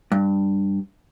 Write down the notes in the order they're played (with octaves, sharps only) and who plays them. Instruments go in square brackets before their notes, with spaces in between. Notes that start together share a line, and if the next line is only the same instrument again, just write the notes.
[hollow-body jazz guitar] G2